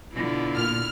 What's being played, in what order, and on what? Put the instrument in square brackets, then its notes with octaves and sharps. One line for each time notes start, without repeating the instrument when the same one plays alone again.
[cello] B2 D3 [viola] E4 F4
[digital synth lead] A#2 [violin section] F6